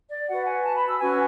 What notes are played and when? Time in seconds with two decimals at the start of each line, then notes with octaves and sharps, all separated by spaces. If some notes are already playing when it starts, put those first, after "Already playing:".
0.09 D5
0.28 F#4 B4 F#5
0.47 G#5
0.64 A5
0.76 B5
0.88 E6
1.01 C#4 F#4 B4 G#5